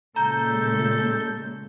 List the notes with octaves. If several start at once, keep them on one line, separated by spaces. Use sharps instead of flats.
A#2 C#3 G#3 A4 A#5 G6